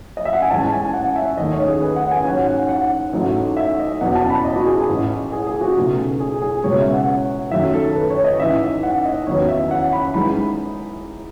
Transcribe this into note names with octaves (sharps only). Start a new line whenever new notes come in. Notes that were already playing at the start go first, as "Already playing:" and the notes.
D#5
E5
F#5
G#5
A1 A2 E3 G#3 A5
G#5
F#5
E5
D#2 D#3 A3 D#5
C#5
G#4
B4
F#5
G#5
G#2 F#3 C#4 F#5
F#5
F#5
A1 G#2 F#3 A3
E5
D#5
E2 B2 F#3 F#5
A5
B5
D#5
F#4
G#4
A1 A2 E3
G#4
G#4
F#4
C#2 B2 A3 D#4
G#4
G#4
C#2 B2 G#3 C#5
E5
F#5
F#2 D#3 F#3 A3 E5
A4
B4
C#5
D#5
A1 G#2 E3 E5
F#5
D#5
E2 D#3 F#3 B3 D#4 C#5
E5
F#5
B5
E3 G#3 D#4 B5